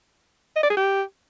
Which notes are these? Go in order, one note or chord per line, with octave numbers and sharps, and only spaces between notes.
D#5
D5
G#4
G4